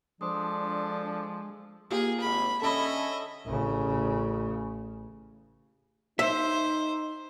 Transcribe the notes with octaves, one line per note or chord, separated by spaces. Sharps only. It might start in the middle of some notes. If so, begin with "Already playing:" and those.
F3 G#3 D4 A4 C5 C6 D#6
A#3 F4 G4 G#4
G#1 B5
D3 C#4 A4 D#5 E5 B5
A1 C#3
D#4 C5 E5